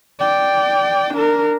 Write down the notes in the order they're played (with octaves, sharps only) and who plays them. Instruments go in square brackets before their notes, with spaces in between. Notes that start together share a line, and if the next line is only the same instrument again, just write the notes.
[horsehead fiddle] D5 G5
D4 A#4